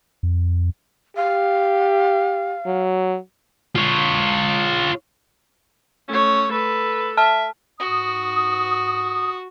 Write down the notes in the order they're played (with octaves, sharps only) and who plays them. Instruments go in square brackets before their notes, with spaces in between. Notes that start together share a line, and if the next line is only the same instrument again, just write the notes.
[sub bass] F2
[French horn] G4 [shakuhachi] F5
[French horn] F#3
[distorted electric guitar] F4 C#5
[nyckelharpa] A3 C#5 [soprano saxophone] C#4
[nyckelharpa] A4 [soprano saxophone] B4
[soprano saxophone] E5 [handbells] A5 F6
[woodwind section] G#2 D#6 [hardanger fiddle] F#4